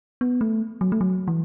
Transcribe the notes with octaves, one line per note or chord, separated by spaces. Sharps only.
B3
A3
F#3
A3
F#3
E3